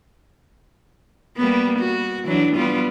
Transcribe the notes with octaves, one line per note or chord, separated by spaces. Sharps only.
G3 A#3 B3
F#4
E3 F#3 D4
G3 B3 F4